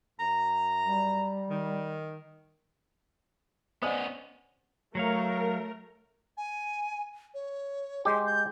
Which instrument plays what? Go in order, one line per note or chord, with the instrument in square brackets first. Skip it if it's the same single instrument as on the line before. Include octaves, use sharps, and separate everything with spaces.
[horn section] F#2 A#5
[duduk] G3
[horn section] D#3
[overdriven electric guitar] B3 C#4 [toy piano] C5 D5 D#5 [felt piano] F#5 G#5 D#6
[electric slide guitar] F#3 C#5 F5 [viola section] A3 A#4
[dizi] G#5
C#5
[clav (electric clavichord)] G#3 G4 [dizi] C6
[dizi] G6